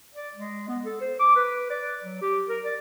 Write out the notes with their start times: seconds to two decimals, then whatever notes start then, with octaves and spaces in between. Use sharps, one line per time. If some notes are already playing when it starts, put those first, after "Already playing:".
0.15 D5
0.35 G#3
0.68 B3
0.85 A4
1.01 C5
1.20 D6
1.36 B4
1.70 D5
2.03 F#3
2.21 G4
2.49 A#4
2.64 D5